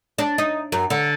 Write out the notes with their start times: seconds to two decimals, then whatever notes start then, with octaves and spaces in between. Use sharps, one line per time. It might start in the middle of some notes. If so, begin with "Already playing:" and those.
0.18 D4
0.38 D#4
0.72 F#2
0.90 D3